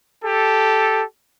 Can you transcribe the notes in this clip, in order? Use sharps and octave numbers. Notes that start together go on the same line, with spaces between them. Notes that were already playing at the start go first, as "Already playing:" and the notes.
G4 A4